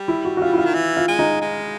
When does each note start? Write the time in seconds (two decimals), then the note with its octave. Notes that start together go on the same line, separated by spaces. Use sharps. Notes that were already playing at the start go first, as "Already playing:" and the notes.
Already playing: G3
0.08 E4
0.25 F#4
0.37 F#4
0.42 F4
0.53 E4
0.58 F4
0.65 D#3
0.74 E3
0.97 F4
1.08 G#3
1.19 D#4
1.41 G#3